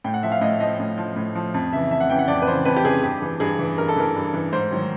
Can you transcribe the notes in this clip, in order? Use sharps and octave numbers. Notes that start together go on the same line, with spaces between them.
A2 G5
F#5
F3 E5
F5
A2 D#5
F3 D#5
A2
F3
A2
F3
F2
C#3 E3 E5
F2 E5
F#5
C#3 E3 G5
F#5
F2 D5
B4
C#3 E3 C5
F2 B4
G4
C#3 E3 G#4
G2 G4
E3
G2 G#4
E3
G2 A#4
A4
E3 A#4
G2
E3
G#2 C5
D#3 F#3